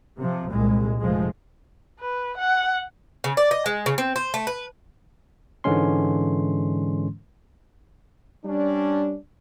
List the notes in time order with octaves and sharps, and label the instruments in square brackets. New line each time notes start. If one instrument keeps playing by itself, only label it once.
[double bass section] C3 F3
C2 A#2 G#3
F1 F3 G#3
[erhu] B4
F#5
[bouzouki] C#3
D5
D#5
G#3
C#3
C4
C5
A3
B4
[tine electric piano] G#2 D3 E3 G#3 C#4 C6
[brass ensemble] G3 C#4 D4